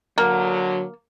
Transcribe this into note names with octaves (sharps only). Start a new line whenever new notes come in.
D3 F#3 A#3